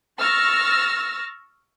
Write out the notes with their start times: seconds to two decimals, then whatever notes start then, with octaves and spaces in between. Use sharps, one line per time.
0.19 C#6 E6 F6 A6 A#6